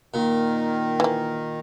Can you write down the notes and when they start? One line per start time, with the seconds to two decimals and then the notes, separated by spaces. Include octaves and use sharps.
0.14 A#2 D#3
1.00 E3 A#3